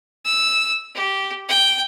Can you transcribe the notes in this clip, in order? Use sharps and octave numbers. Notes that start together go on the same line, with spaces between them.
E6
G4
G5